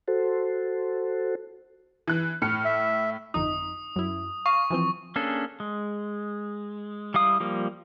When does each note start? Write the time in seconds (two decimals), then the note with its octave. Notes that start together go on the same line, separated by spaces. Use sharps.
0.08 F#4 A4 C5
2.07 E3 F#6
2.42 A2 F6 C#7
2.65 E5
3.34 G1 F2 D#4 D#6
3.96 F#2 E4
4.46 F5 C#6
4.70 E3 F3 C4
5.16 A#3 C#4 D4 G#4 A4
5.60 G#3
7.14 G3 E4 F5 D#6
7.40 F3 G3 A#3